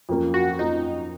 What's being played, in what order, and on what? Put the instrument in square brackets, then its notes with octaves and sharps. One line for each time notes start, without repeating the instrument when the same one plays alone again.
[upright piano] F2 F3 A#3 C#4
[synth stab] F#4
[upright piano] F2 F3 A#3 C#4 [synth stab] D#4